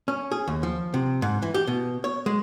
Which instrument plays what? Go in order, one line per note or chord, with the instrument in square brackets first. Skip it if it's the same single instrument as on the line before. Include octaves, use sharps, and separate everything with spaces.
[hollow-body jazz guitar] C#4
G#4
D#2
F3
C3
G#2
E3
G4
B2
C#5
G#3